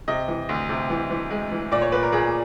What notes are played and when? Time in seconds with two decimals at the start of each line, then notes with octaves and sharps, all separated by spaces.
0.08 C3 D#5
0.28 E3
0.49 D2
0.69 C3
0.90 E3
1.10 E3
1.31 G#3
1.52 E3
1.72 A#2 D5
1.82 C#5
1.92 A#2 B4
2.03 A#4
2.12 A#2 G#4